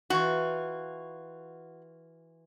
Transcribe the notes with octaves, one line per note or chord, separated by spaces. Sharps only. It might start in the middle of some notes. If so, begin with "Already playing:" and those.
E3 F4 F#4